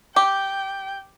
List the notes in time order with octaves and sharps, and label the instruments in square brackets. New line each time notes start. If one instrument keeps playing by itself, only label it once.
[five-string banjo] G4 [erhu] G5